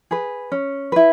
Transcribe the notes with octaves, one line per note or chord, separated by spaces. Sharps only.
G#4 B4
C#4
E4 B4